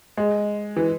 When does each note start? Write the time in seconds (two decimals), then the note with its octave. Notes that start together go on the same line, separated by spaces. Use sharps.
0.17 G#3
0.76 E3